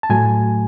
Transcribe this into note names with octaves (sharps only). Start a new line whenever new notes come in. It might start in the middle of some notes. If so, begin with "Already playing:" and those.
A5
A2 F#3 A3 G#5